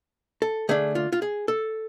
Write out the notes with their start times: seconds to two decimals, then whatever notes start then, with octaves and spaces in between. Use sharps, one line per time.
0.42 A4
0.69 D3 A3 D4 G#4
0.95 F4
1.12 F4
1.22 G#4
1.48 A4